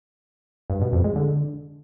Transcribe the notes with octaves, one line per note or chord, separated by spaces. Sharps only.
G2
B2
F2
G#3
D3